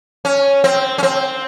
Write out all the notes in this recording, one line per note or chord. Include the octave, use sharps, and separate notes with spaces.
C#4
C4
C#4
C4